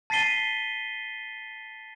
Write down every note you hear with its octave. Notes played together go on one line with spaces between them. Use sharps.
A5 A6 B6 C7 D#7 G7